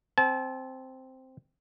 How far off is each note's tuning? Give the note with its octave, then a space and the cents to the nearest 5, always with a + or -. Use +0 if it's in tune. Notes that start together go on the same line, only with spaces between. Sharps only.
C4 +0 A5 -35